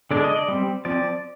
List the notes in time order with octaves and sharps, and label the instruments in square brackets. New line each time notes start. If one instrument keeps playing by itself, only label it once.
[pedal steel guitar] D3 G#3 D4 D5
D#5
D5
G3 C4
F3 C4 D5